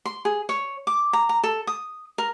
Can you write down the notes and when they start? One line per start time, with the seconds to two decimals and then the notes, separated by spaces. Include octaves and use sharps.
0.05 C6
0.25 G#4
0.49 C#5
0.87 D6
1.13 A#5
1.29 A#5
1.43 A4
1.67 D#6
2.18 A#4